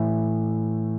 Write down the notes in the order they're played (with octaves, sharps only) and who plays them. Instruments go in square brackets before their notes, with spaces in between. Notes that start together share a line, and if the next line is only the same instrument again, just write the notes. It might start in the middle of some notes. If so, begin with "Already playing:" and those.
Already playing: [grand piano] A2 E3 E5